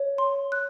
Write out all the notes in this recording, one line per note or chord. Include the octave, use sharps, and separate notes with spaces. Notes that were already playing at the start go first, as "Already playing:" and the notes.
Already playing: C#5
C6
F#6